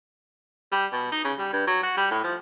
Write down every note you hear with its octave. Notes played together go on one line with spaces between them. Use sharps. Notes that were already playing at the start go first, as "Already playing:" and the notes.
G3
B2
D#4
C#3
G3
G2
F#3
F#4
G3
A2
F3